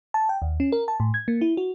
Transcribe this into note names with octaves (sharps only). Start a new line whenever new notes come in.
A5
G5
D#2
C#4
A#4
A5
A2
G#6
A#3
E4
F#4